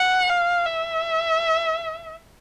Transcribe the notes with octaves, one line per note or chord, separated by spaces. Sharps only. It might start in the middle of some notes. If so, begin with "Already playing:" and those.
Already playing: F#5
F5
E5